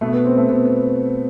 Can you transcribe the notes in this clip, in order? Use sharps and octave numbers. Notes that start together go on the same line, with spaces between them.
B2 A3
B3
C4
A3
B2 B3
B3